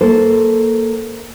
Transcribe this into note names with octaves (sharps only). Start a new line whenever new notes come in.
A#3 A4 C5